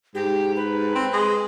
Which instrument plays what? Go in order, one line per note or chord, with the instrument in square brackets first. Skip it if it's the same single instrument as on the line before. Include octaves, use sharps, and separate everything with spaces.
[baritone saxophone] G#2 [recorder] G4
[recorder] B4
[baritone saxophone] C4
G#3